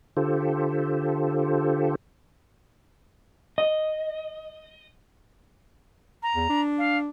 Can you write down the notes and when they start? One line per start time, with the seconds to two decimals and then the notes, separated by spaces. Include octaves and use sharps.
0.17 D3 F4 G4 A4 C5
3.58 D#5
6.23 A#5
6.36 E2
6.50 D4
6.78 F5